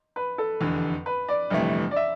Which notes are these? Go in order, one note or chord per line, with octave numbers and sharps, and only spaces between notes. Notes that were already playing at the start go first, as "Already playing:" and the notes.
B4
A4
F1 E2 D3
B4
D5
G1 F2 C3 E3 A3
D5
E5